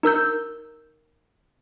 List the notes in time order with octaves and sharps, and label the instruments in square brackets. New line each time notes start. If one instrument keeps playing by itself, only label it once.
[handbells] D#4 A#4 E6 G6